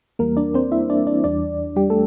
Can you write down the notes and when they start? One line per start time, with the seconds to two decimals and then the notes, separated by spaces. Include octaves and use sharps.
0.19 E2 E3 G3 A#3 A#4
0.37 D4 D5
0.54 C4 C5
0.72 E4 E5
0.90 D4 D5
1.07 D4 D5
1.24 E2 E3 G3 D4 D5
1.76 G3 G4
1.90 A3 A4